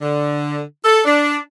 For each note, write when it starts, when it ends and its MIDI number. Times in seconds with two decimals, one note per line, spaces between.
0.01 0.59 50
0.85 1.02 69
1.05 1.38 62